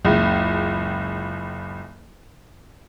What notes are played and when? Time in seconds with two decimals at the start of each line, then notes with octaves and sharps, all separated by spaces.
0.05 F#1 C#2